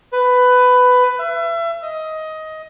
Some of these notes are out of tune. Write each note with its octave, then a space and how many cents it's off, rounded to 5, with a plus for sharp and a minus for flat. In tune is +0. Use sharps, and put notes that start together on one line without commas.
B4 +15
E5 +30
D#5 +15